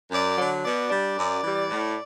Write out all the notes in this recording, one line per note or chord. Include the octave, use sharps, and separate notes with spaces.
F#2 D5
D3 F#3
B2 D5
G3 D4
F#2
E3 G3
A2